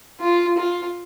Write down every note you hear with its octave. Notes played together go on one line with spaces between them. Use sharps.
F4
F4